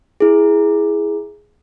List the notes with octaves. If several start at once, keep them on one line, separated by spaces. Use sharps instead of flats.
E4 G#4